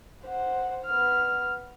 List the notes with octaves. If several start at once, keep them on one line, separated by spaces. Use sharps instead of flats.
C5 F#5
B3 F6